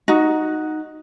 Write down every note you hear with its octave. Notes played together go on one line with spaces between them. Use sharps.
D#4 F#4